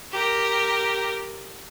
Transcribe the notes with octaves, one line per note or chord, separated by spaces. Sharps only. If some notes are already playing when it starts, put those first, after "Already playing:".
G4 A#4